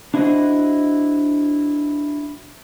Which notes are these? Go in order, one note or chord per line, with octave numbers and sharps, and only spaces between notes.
D4 E4 F#4 C5 D#5